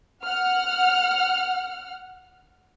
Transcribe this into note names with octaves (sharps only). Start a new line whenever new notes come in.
F#5 F6